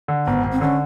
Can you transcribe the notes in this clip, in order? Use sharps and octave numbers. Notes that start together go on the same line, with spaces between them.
D3
G#1 B3
G#1
C4
D3 C#4